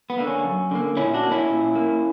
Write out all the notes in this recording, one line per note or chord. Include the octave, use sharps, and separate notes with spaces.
B3
D3 A#3
C#4
F#2
D3 A#3
A#2 C#4 E4
D4 F#4
A#3
C#4 E4
A#2
A#3